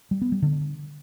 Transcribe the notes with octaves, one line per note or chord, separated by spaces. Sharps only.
G3
B3
G3
D3